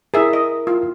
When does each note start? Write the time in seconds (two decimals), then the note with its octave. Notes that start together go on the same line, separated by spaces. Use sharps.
0.14 E4 G#4 A#4 E5
0.33 D#5
0.67 F4